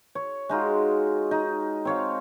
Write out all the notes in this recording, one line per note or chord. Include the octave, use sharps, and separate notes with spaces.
C#5
G#3 D#4 F4 F#4
D#4
C4 C#5 F5